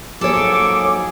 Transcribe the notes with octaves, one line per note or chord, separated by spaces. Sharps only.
G#2 F3 F#3 A#3 G#4 A4 C#5 D6